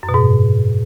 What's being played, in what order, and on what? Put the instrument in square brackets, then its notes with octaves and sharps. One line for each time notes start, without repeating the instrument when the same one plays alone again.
[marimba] F#2
B2
G#2